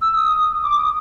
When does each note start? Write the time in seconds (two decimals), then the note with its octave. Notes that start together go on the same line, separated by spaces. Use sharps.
0.02 E6
0.16 D#6
0.63 D6
0.79 D#6